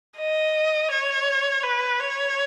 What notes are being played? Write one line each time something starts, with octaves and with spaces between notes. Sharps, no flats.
D#5
C#5
B4
C#5